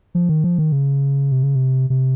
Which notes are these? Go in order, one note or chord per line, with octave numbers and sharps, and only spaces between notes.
F3
D#3
F3
D#3
C#3
C3
C#3
C3
C3